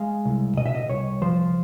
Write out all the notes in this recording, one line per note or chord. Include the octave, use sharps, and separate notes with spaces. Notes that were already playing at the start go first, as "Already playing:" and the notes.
Already playing: G#3 F5
C2
B2 D#5
E5
D#5
C2 C#5
F3 C5